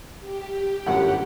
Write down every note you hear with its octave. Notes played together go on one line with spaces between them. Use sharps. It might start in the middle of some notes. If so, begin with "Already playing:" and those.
G4
G1 F#2 A2 F#5